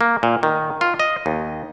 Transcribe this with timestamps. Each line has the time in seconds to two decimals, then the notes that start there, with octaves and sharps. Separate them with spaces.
0.01 A#3
0.23 A#2
0.43 D#3
0.81 F4
1.00 D#5
1.26 D#2